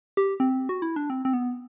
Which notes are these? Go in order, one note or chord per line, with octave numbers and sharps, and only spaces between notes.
G4
C4
F#4
E4
D4
C4
C4
B3